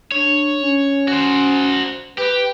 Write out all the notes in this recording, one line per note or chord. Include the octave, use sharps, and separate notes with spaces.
D4 C#5
C#4
F#4 C5
G4 B4